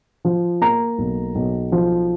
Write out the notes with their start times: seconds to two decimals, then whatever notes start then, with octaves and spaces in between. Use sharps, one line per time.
0.25 F3
0.61 A#3 A#5
0.98 B1
1.35 B1
1.72 F3